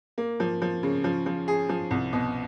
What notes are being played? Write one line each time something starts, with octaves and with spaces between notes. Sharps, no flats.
A#3
F3
F3
C#3
F3
F3
G#4
F3
C2
B2